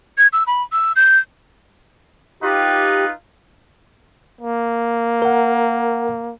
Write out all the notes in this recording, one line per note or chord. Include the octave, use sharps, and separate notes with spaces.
G#6
E6
B5
E6
G6
D#4 F4 G4 B4
A#3
A#4 F#5